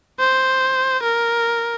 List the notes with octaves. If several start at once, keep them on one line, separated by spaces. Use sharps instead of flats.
C5
A#4